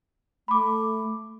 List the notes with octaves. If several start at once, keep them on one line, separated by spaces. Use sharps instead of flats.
A3 B5 D6